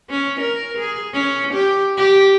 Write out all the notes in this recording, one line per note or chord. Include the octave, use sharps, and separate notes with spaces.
C#4
A#4
G#4
C#4
G4
G4